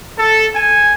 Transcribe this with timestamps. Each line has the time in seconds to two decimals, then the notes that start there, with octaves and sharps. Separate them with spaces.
0.17 A4
0.55 G#5